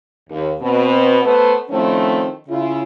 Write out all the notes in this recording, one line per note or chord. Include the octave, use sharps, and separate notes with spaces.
D#2
B2 B3 C4
A3 B3 B4 C5
D#3 F3 A3 C4 C#4 E4
C#3 E4 F4